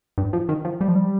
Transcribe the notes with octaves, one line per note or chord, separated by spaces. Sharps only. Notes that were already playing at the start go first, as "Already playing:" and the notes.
G2
F3
D#3
F3
G3
F3
G3